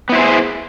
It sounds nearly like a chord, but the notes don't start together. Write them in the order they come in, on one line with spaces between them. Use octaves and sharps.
B3 E4 C5 G#4